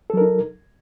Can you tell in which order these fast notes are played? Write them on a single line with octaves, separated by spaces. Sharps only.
A4 F#3 A#4 D#4